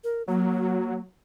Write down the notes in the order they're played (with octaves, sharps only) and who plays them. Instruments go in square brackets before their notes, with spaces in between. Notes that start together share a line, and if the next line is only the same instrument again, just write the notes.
[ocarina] A#4
[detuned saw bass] F#3 [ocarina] A#3